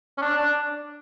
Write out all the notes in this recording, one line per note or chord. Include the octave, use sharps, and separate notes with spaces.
C#4
D4
D4